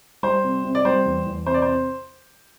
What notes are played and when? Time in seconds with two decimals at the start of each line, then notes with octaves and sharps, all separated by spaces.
0.23 G3 C5
0.44 C3
0.64 C3
0.75 D5
0.85 G3 C5
1.05 E2
1.26 E2
1.46 C3 C5
1.54 D5
1.62 C3 C5